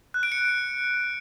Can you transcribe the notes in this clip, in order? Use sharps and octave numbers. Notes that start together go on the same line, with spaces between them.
F#6
D7
C#7